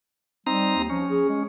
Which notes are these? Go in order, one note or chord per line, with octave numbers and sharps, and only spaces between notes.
G3 C4 D#4 A#5
D#2
F3 C#4
G#4
G#3